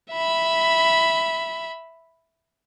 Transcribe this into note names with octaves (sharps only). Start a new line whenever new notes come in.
E5 B5